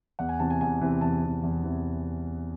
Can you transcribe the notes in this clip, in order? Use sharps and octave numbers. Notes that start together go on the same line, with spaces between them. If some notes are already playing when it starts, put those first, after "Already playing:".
E2 F#5
G#5
C3 E3 A5
G#5
E2 G#5
C3 E3
E2 A5
C3 E3
E2
C3 E3